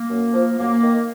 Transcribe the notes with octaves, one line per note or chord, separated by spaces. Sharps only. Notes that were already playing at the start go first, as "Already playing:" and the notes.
Already playing: A#3
F#2
F3
F#2 A#3
D#3